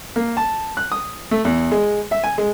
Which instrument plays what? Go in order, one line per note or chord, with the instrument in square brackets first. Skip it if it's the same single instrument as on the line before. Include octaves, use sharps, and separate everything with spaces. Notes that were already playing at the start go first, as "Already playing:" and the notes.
[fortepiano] A#3
A5
F#6
D#6
A3
E2
G#3
E5
G#5
G#3